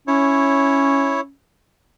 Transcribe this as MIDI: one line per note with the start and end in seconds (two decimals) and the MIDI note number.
0.08 1.33 61
0.08 1.21 64
0.08 1.21 73